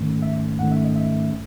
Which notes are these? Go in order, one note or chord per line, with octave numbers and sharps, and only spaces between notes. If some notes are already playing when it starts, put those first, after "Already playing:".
Already playing: G#2 D#3 A3 C#4
E5
G#2 D#3 A3 C#4 F#5
E5
D#5
E5